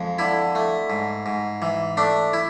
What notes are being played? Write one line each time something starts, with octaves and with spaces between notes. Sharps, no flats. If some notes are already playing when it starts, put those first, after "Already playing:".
Already playing: F2 G#3
D3 E4
A3
G#2
G#2
E3
A3 D4
E4